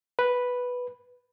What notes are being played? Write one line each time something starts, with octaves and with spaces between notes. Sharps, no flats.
B4